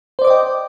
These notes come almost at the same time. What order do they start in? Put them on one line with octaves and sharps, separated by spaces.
C5 D5 D6 D#5 G5